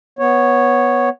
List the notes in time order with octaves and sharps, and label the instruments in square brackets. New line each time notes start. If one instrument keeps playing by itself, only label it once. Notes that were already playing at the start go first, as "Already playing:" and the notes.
[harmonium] B3 C#5